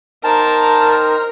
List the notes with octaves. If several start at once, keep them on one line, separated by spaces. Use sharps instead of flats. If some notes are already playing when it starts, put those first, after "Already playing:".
D#4 A#4 C5 G5 A5